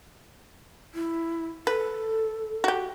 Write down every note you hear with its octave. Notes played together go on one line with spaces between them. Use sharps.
E4
A4 B4
F#4 G4